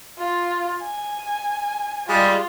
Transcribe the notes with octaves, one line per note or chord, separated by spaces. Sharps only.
F4
G#5
G3 G#3 F4